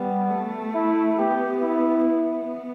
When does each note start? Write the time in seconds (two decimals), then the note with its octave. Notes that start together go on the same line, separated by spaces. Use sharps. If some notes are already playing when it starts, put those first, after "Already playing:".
Already playing: G3 B3
0.30 A3
0.74 E4
1.18 B3 G4
1.62 E4
2.06 B3